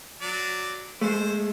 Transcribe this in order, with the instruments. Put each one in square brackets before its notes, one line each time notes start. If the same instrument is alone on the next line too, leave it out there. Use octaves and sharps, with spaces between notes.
[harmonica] F#3 D5
[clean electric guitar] G#3 A3 [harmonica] C5